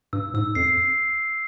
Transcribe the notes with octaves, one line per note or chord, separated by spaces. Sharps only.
G2 E6
G#2 E6
F2 C7